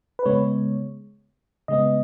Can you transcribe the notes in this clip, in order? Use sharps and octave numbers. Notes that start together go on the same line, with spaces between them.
B4
C#3 G#3 B3 C#5
C#3 G#3 B3 D#5